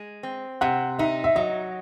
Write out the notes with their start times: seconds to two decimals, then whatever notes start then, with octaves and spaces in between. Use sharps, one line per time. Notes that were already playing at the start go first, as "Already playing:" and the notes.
Already playing: G#3
0.23 C4
0.61 C3 F#5
0.99 D#4 E5
1.24 E5
1.36 F#3 D#5